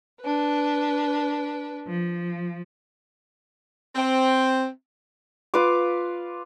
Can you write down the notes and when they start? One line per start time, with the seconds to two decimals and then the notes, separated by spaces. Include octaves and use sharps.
0.20 D4 B4
1.87 F3
3.95 C4
5.54 F4 B4 F5 D6